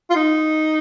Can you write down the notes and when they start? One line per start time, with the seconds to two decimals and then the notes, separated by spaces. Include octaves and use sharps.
0.10 F4
0.16 D#4